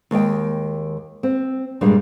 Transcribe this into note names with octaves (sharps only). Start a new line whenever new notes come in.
D#2 G#3 D#5 G5
C4
G2 A#2 G3 G#3 A#3 D4